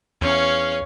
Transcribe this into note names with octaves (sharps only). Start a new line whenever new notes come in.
E2 C#4 C#5 F5